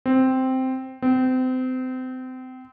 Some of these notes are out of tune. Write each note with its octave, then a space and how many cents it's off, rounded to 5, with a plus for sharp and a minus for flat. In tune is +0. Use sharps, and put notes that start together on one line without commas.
C4 -5
C4 -30